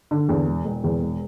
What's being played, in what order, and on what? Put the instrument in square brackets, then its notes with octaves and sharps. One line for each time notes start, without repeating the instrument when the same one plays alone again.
[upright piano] D3
E2
E1
E1
E2
E1